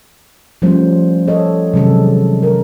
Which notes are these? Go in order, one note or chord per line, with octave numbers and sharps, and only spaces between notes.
F3 G3 A3 C#4 C5
A4 C#5 D#5
C3 D#3 F#3 G#3 C#4 A4
A#4